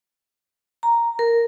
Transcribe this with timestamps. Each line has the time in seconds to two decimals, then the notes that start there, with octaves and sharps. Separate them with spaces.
0.83 A#5
1.19 A#4